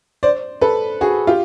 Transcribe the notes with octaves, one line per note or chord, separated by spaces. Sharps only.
C5 D5
A4 B4
F#4 G#4
F4 G4